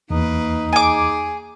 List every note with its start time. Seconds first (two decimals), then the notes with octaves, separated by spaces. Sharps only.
0.10 E2 A#3 D#4 B4
0.73 G#4 G#5 D6